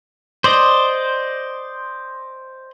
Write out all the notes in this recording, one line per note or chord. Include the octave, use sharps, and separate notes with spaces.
C5 D5 D#5